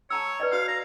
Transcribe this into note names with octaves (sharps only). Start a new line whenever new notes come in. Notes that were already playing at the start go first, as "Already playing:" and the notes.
C#5 A5 A#5 E6
B4 D5 D#5
F#4 C#5 F5
A#5